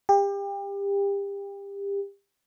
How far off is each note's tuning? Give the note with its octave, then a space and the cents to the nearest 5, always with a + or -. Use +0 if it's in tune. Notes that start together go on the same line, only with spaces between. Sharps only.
G4 +30